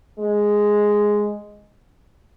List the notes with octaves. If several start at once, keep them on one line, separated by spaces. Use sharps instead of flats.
G#3